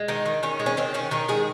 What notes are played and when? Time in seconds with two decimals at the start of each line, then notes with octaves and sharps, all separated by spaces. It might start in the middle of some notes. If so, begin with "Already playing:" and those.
Already playing: G#3
0.08 D#3 D#4
0.26 D#3
0.43 D#3 C#4
0.59 G#3
0.66 C#4
0.77 D#3 C4
0.94 D#3 C#4
1.11 D#3 D#4
1.28 G#3 G#4